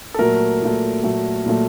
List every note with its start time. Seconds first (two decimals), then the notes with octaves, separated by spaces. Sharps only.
0.14 A4
0.19 A#2 F#3 A3 A#4
0.62 A#2 F#3 A3
1.04 A#2 F#3 A3
1.46 A#2 F#3 A3